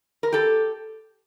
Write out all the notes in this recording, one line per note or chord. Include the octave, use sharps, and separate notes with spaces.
A#4
G4 A4